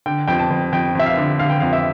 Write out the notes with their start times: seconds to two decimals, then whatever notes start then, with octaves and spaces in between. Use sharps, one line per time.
0.06 D3 G5
0.28 F2 G5
0.39 A5
0.50 F2
0.72 F2 G5
0.95 F2 E5
1.06 F5
1.17 D3
1.39 D3 F5
1.50 G5
1.60 F2 F5
1.73 E5